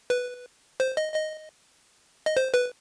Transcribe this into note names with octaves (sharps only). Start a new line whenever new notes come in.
B4
C5
D#5
D#5
D#5
C5
B4